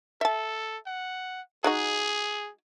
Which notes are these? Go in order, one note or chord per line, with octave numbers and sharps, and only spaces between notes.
A4 E5 A5
F#5
G#3 D#4 F#4 G#4